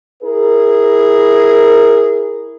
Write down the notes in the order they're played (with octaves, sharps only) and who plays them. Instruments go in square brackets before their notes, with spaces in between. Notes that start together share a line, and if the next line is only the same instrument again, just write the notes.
[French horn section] E4 G#4 A#4